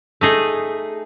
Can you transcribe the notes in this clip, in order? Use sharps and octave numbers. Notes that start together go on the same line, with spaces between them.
A3 D#4 G#4